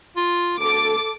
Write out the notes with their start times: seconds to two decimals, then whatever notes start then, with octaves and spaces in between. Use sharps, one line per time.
0.17 F4
0.58 D2 A4 D6